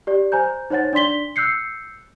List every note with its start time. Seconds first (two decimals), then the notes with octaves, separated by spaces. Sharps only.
0.07 G4 D5
0.32 C5 G#5 A#5 G6
0.70 D#4 C5 C#5 F#5 A6
0.93 D4 D5 C6 B6 G7
1.36 E6 F#6 G6 C7 C#7